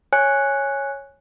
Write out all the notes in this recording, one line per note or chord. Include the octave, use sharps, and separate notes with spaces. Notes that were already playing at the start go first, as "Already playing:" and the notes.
C#5 G#5 F#6 C#7